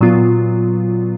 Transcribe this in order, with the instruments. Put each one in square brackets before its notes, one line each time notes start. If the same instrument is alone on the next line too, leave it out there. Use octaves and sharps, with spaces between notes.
[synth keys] A#2 F#3 B3 F4